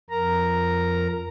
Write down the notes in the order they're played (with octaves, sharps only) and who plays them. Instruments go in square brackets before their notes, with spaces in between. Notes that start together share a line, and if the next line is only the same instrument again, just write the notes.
[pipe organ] F2 A#4 A#5